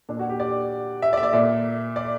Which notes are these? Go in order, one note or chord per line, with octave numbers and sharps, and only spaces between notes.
A#2 D4
F#4
G4
D5
E5
D5
E5
D5
A#2 E5
D5